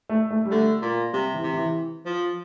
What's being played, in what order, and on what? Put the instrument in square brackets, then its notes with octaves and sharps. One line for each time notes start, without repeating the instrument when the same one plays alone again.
[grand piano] A3
A3
G3
[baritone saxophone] D3 [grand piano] A3
[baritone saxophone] A#2
[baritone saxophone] C3 [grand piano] G3
[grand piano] E3
[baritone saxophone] C3
[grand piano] E3
[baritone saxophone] F3